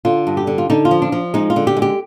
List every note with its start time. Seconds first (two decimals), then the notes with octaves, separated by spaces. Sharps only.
0.05 D3 F4
0.27 G2
0.37 G4
0.47 D3
0.58 F4
0.70 D3 D#4
0.85 F4
0.91 F3
1.02 D4
1.12 F3
1.34 G#3 D#4
1.50 F4
1.56 D3
1.67 G4
1.77 G#3
1.82 G4